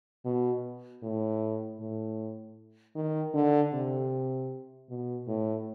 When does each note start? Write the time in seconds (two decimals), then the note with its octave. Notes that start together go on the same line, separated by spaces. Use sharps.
0.25 B2
1.03 A2
1.80 A2
2.96 D#3
3.34 D3
3.73 C3
4.90 B2
5.28 A2